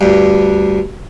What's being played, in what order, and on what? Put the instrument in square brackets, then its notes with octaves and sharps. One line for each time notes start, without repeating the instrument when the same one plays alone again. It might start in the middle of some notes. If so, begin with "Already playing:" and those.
[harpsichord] D2 G2